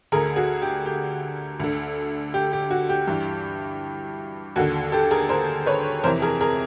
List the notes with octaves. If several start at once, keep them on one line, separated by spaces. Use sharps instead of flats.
D2 D3 G#4 A#4
F#4 G#4
G4
G4
D2 D3
G4
G4
F#4
G4
G2 E3
D#2 D3 F#4
G4 A4
G#4 A#4
A#4 C5
B4 C#5
F2 C3 E3 A#4 C5
G#4 A#4
G#4 A#4